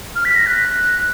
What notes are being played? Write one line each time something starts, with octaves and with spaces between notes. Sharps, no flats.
F6
B6
A#6
F#6